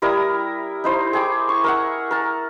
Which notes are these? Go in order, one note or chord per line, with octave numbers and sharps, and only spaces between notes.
G3 E4 A#4 D#6
D#4 E4 C5
G#4 G5 D6
C#6
A#4 E5 F#5
A#4 A5